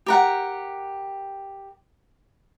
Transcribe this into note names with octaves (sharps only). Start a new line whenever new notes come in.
G4 A#4 F#5